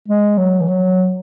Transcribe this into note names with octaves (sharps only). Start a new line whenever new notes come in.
G#3
F#3
E3
F#3